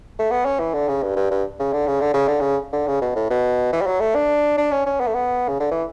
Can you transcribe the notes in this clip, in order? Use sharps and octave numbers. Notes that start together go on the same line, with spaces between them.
A3
B3
C#4
E3
D3
C#3
G2
G2
G2
C#3
D3
C#3
D3
C#3
D3
C#3
D3
C#3
B2
A2
B2
E3
G3
F#3
A3
D4
D4
C#4
C#4
B3
A3
B3
C#3
D3
E3